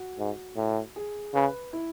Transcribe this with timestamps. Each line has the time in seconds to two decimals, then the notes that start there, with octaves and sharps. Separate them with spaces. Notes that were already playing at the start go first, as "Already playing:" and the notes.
Already playing: F#4
0.18 G#2
0.57 A2
0.96 G#4
1.34 C#3 B4
1.73 E4